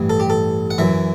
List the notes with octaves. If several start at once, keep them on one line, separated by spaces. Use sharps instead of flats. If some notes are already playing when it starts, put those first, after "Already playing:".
Already playing: A1 G2 E3
A4
G4
A4
F#5
F#2 E3 E5